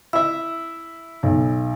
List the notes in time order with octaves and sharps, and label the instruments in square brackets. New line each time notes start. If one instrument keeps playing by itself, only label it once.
[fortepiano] E4 E5 [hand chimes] E6
[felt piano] B1